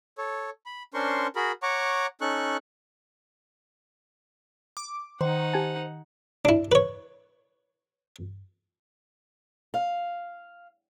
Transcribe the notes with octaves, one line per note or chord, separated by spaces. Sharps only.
A4 C#5
B5
C#4 D4 A#4 C5 C6 C#6
F#4 G#4 A#4 B5
C#5 F#5 A#5 C#6 D6
C#4 D#4 A4 C#6 F#6
D6
D#3 D#4 C5 F#5
G4 G#5 A5
D4 E4
B4 C#5
F5